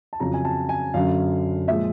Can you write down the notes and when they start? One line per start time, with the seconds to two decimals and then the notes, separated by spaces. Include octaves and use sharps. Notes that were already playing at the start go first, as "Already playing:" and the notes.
0.13 A5
0.20 F2 C#3 F#3 A#5
0.34 G#5
0.45 A5
0.69 G#5
0.94 F#2 D3 F#3 F5
1.68 A#2 F3 G#3 E5